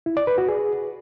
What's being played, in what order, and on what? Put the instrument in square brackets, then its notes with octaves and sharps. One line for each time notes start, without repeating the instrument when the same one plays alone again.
[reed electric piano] E4
D5
B4
F#4
G#4